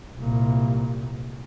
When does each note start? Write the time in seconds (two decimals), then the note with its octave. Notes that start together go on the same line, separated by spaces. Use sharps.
0.18 C2 A#2